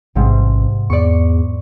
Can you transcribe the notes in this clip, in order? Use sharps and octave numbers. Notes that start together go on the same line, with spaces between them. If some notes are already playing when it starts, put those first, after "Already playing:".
A1 G#2 C3
E2 D5 C#6